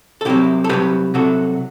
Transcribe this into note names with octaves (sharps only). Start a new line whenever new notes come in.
A4
C2 C3 F#3 E4 G4
A4
C2 C3 F#3 G4 B4
C2 C3 F#3 F#4 A4